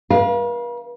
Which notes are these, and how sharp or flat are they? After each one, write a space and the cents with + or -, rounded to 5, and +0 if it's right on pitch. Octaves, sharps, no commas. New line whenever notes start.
B4 -45 F5 +0